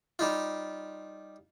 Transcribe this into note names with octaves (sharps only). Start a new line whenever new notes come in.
G3 D#4 F4